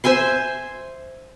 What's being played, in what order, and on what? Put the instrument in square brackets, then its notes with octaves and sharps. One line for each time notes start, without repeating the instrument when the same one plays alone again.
[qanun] C5 E5 G#5 C6